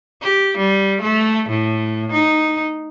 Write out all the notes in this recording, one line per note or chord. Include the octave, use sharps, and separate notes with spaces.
G4
G3
A3
A2
D#4